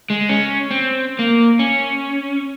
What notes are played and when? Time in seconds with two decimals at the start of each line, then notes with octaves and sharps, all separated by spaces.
0.10 G#3
0.29 C#4
0.71 C4
1.19 A#3
1.59 C#4